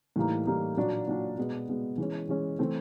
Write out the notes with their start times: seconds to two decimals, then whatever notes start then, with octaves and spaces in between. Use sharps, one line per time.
0.16 A2 E3 G3 A#3 D#4
0.47 A2 E3 G3 A#3 D#4
0.77 A#2 F#3 A#3 D4 F#4
1.08 A#2 F#3 A#3 D4 F#4
1.38 B2 G#3 B3
1.68 B2 G#3 B3
1.98 E3 G#3 C#4
2.29 E3 G#3 C#4
2.59 E3 A3 C4